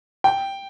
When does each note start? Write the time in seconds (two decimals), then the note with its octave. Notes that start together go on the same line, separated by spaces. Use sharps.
0.24 G5